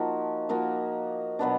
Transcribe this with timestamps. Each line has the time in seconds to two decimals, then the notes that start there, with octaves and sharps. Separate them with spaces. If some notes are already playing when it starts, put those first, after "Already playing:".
Already playing: F3 A#3 D#4 F#4
0.49 F3 A#3 D#4 F#4
1.39 B2 F#3 B3 D4